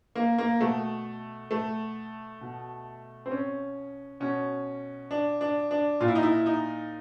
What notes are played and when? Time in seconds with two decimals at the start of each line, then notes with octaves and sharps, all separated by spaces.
0.16 A#3
0.38 A#3
0.61 B2 A3
1.51 A3
2.41 B2
3.26 C4
3.31 C#4
4.20 B2 C#4
5.11 D4
5.41 D4
5.71 D4
6.01 A#2 F4
6.08 E4
6.15 D#4
6.23 E4
6.46 D#4